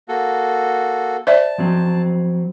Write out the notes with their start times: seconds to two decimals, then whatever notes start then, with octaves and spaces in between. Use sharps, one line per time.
0.08 A#3 F#4 A4
1.27 C5 D5 E5 A5
1.58 F3 F#3 C4